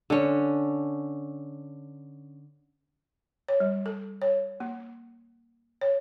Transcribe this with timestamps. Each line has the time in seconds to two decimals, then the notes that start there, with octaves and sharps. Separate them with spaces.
0.10 D3 C#4
3.48 C#5
3.60 G3
3.86 A4
4.22 C#5
4.60 A#3
5.81 C#5